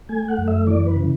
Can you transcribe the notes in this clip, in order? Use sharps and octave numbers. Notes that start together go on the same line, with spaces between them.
A3 G#5
F#5
F#2
E5
E3 D5
B4
C#3